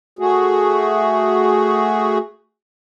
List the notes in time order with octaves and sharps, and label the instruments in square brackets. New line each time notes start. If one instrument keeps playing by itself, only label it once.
[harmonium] A3 F#4 G#4